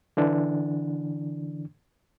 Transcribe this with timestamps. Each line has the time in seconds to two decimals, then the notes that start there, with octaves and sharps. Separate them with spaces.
0.17 D3 E3 D4